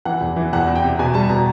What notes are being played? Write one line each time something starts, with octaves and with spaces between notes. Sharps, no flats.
E3 F#5
E2
E3
E2 F#5
E2
G5
C3
B2 G#5
G3 A5
B2 A#5